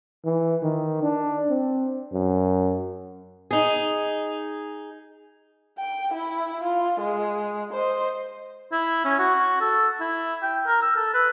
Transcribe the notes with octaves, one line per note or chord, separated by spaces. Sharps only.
E3
D#3
D4
C4
F#2
D#4 G#4
G5
E4
F4
G#3
C5 D#5
E4
C#4
F#4
A4
E4
G5
A#4
E6
A4
B4